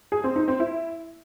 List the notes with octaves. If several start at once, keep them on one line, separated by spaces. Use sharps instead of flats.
G#4
C4
D#4
C4
E4